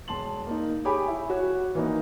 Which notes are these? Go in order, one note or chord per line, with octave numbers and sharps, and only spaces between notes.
E1 A5 C6 F#7
A#3 D#4
G4 G#4 C#5 G#5 B5 D6
E4
F#4 C#5 F#5
E3 A#3 D#4